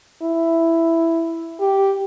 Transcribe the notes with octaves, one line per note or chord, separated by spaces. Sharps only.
E4
G4